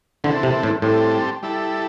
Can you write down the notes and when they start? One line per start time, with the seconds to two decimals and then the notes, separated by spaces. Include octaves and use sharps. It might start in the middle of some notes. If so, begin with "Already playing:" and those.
0.24 D3 E3 C4 A4
0.43 C3
0.63 A2
0.82 A2 G3 C4 A4
1.43 G3 E4 A4